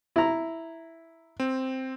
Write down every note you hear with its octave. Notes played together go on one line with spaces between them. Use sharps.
E4 A#5
C4